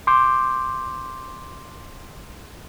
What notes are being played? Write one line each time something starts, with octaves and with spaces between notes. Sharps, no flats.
C6 D6 G6